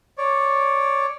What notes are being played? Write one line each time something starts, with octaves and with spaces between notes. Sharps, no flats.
C#5 D5